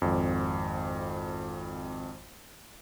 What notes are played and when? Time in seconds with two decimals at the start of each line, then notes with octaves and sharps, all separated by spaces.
0.02 G#1 F2